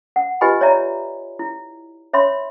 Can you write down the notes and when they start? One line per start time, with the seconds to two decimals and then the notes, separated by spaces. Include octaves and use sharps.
0.16 F#5
0.41 F4 G4 B4 D#5 G#5 B5
0.61 C#5 D5 E5 A#5
1.39 E4
2.13 C#5 E5 B5 C6